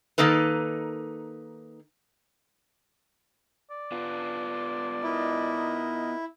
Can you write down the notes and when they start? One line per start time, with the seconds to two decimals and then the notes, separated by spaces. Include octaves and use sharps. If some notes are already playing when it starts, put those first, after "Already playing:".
0.18 D#3 A#3 D#4 A4 B4
3.71 D5
3.92 B3 F4
5.03 D#4 E4 A#4 D#5